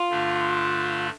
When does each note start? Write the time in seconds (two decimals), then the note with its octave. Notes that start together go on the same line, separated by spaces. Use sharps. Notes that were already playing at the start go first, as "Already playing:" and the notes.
Already playing: F4
0.10 G2 D3 A3 D4